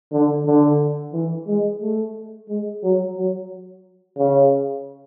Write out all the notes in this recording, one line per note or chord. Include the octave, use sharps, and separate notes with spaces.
D3
D3
E3
G#3
A3
G#3
F#3
F#3
C#3